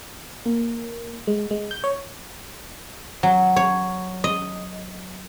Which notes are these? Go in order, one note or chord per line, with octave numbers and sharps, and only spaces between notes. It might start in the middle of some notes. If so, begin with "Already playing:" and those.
A#3
G#3
G#3
G6
C#5
F#3
C#5
D#5